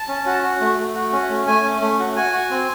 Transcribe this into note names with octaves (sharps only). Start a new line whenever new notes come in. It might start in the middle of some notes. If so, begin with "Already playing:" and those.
Already playing: A5
C#4
F#4
F#4
A3
A3
F#4
C#4
A3
A3 G#5
C#4
A3
F#4
F#4 G#5
F#4
C4